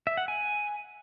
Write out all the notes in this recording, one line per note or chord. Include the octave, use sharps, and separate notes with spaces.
E5
F#5
G#5